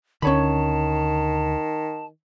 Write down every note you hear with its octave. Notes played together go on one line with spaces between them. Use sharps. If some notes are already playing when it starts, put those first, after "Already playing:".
D2 D3 D#3 C#4 C#5 A5 B5